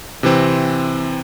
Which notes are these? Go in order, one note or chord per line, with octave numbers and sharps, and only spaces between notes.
C3 E3 C4